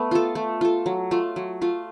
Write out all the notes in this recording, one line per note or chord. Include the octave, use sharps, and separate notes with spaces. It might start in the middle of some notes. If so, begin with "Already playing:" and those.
Already playing: A3 B3
F4 A4
A3
F4 A4
F#3
A3 F4
F#3
A3 F4